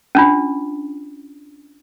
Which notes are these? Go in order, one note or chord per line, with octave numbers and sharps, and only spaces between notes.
C#4 D4 F4